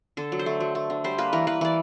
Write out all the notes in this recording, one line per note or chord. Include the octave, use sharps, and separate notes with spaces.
D3 A4
F#3
C5
A3
F#3
A3
D3
G3 C5
A#3 B4
E3 A#4
E3 B4
E3 D5